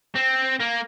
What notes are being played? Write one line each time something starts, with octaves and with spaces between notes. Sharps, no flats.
C4
A#3